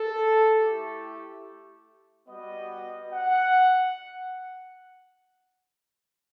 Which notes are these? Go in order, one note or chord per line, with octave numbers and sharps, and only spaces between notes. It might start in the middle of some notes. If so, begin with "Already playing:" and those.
Already playing: A4
A3 E4 G4
G3 B3 F#4 D#5
F#5